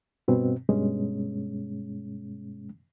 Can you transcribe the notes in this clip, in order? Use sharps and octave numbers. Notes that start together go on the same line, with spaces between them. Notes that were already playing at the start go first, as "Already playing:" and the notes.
G2 B2 C4
G2 B2 G#3 C#4